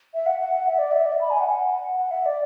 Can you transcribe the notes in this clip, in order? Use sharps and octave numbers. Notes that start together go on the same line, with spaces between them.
E5
F#5
F#5
F#5
E5
D5
E5
D5
E5
B5
G#5
F#5
F#5
E5
D5